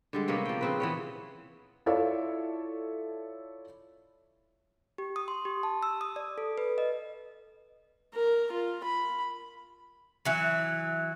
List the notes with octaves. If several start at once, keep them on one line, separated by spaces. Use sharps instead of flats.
D3 G3 G#3
C3 A#3 B3 C#4
F3 G5
C#3 C4 B4
E3 B3 C#4
E4 F4 A4 C#5 D5 E5
G4
D#6
C6
G4
A5
E6
D#6
D5
A4
B4
D#5
A#4
F4
B5
E3 F#3